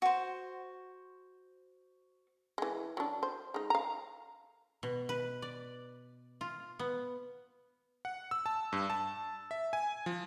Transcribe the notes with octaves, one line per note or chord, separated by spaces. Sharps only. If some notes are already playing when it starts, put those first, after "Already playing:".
F#4 C5
E3 G#3
F#3 D4
C5
G#3 D#4
F5 A#5
B2
B4
D5
F4
B3
F#5
E6
A5
G2
A5
E5
G#5
F3